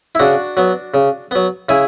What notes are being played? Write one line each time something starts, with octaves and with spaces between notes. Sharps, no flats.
E4
C#3 D4 F#4
F#3 B3
C#3
F#3 B3
C#3 E4 G#4